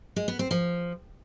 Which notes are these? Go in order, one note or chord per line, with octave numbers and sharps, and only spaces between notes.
G#3
B3
C4
F3